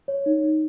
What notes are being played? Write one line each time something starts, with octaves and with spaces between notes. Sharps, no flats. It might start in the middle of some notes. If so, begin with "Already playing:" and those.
C#5
D#4
D#4